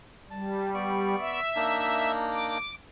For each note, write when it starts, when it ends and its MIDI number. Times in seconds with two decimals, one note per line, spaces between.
0.31 1.15 55
0.31 0.71 81
0.74 1.40 59
0.74 1.40 74
0.74 1.40 85
1.20 2.12 76
1.56 2.58 58
1.56 2.58 62
1.56 2.58 63
2.32 2.74 86